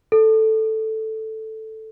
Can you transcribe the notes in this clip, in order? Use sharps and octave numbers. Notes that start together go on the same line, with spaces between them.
A4